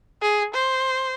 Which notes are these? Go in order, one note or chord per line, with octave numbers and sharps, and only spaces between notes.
G#4
C5